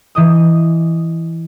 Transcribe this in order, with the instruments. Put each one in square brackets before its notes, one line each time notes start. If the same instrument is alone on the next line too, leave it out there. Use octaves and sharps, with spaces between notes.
[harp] E3 D#5 D#6